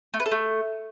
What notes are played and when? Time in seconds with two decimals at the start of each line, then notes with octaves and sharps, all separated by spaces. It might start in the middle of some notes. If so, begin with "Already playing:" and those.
0.14 A3
0.20 B4
0.26 A4
0.32 A3